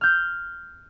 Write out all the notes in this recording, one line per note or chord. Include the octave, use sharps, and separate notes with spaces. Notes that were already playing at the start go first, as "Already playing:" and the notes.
F6 G6